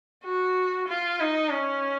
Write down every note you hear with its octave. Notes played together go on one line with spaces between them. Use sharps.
F#4
F4
D#4
C#4